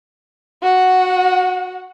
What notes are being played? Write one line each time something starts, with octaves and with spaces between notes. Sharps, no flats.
F#4 F#5